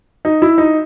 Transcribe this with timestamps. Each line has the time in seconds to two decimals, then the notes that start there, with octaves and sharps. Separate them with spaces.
0.25 D#4
0.42 E4
0.58 D#4